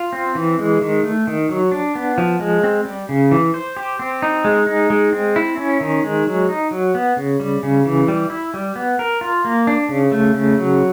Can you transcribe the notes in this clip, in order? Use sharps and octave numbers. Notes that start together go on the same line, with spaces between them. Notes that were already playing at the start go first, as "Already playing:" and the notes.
Already playing: F4
C4
E3
G#3
D#3
A3
D#3
F#3
D4
B3
F3
G#3
C4
G3
C#3
E3
C5
G4
C4
D#4
G#3
D#4
G#3
C4
E4
C#4
D#3
G#3
F#3
D#4
F#3
B3
C#3
G3
C#3
E3
G3
E4
G3
B3
A#4
F4
A#3
D4
C#3
A3
C#3
F#3